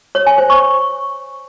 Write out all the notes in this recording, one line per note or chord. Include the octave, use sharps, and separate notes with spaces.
C#5
G#5
C5
C#6